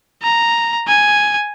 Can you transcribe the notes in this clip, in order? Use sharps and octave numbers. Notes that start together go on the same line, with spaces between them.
A#5
G#5